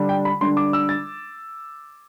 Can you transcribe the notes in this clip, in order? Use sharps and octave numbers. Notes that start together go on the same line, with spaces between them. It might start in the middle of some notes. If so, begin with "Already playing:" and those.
Already playing: D3 G3 D4
G5
B5
D3 G3 D4 C6
D6
E6
A6